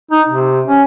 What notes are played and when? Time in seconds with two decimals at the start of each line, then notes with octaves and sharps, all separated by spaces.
0.11 D#4
0.29 C3
0.68 C#4